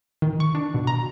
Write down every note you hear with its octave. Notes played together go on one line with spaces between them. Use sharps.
D#3
C#6
D4
B2
A#5